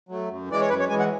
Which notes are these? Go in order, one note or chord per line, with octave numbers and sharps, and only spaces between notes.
F#3 A3
F#2
E3 G#3 D5
C#5
F#2 B4
C#5
E3 G#3 G#5
F#5